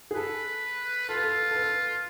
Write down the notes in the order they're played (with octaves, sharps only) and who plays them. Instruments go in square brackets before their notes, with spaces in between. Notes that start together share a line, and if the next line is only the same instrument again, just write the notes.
[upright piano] G#4
[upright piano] A4 [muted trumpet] B4
[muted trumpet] F4 [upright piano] A4
[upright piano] B4
A4
A4
B4